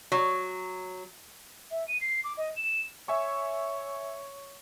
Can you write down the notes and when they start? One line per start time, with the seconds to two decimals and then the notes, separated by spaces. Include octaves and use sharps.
0.12 F#3
1.71 E5
1.88 D#7
2.01 C7
2.24 D6
2.37 D#5
2.56 E7
3.08 C#5 E5 G#5 C#6